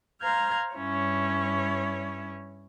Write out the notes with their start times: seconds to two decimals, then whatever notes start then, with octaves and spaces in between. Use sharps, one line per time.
0.21 C5 F5 A#5 F6 G6 G#6
0.75 G2 C#4 E4 C#5